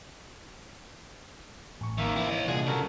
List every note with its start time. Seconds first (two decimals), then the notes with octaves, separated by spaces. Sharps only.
1.81 A1 C#6
1.98 E2 D#3 A#3 E5
2.16 E3 C4 E4
2.29 C#5 D#5
2.48 C2 A#2 D4 F4 G#4 F#5 F#6
2.66 C#3 F#4 A4 A#4